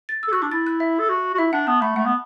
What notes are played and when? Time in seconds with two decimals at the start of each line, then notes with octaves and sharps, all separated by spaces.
0.09 A6
0.23 E6
0.28 A4
0.32 F#4 F#6
0.42 D4 D6
0.52 E4 A6
0.67 F#6
0.80 E5
0.99 A4
1.09 F#4
1.34 F#4
1.38 E4 E5
1.53 D4 F#5
1.67 B3 A5
1.82 A3 B5
1.96 A3 F#5
2.06 B3